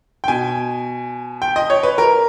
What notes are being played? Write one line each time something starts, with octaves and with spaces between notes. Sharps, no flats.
G5
B2 G#5
G5
D#5
C#5
B4
A#4